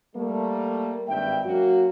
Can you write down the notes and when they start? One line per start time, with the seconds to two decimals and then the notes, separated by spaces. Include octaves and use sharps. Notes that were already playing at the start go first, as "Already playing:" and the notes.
0.16 G3 A3 A#3
1.09 G#1 G2 E5 G5
1.46 F#3 A#3 C#4 F#4